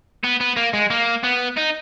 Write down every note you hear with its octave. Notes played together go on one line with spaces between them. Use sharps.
B3
B3
A#3
G#3
A#3
B3
D#4